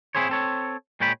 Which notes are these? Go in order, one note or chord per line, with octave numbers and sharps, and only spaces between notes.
C4 E4 G#4 C5 C#5
C4 A4 C#5
A#2 G#3 C#5 G5 B5